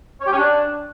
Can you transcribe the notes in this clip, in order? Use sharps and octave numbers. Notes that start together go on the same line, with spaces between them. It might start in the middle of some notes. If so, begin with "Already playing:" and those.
C#5
G4
C#4
D4